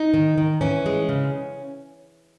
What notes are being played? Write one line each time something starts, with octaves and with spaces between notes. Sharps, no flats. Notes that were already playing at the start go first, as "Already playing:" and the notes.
Already playing: D#4
D#3
D#3
E3 C#4
G#3
C#3